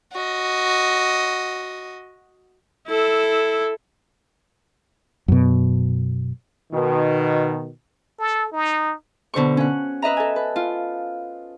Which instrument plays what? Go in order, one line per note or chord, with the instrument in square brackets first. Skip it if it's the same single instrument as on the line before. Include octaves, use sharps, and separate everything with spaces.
[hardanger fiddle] F#4 D#5
[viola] E4 A4
[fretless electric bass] F#2 B2
[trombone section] B2 D#3
[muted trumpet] A4
D#4
[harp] B2 D3 C5 C#6
C#4 F#5
B4 D#5 E5 A#5
A4 G#5
B4
F4